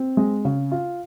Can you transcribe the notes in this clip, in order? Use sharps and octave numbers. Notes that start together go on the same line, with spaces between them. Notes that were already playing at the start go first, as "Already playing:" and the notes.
Already playing: C4
G#3
C#3
F4